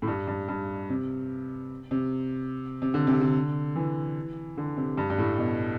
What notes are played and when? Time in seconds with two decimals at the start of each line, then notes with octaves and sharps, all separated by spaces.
0.02 A2
0.08 G2
0.27 G2
0.48 G2
0.90 C3
1.91 C3
2.82 C3
2.94 D3
3.07 C3
3.21 D3
3.76 E3
4.58 D3
4.77 C3
4.97 G2
5.10 G2
5.18 A2
5.38 B2